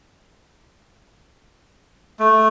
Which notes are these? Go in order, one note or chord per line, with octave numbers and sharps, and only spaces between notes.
A3